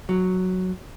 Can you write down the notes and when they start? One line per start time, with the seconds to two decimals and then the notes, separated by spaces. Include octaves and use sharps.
0.09 F#3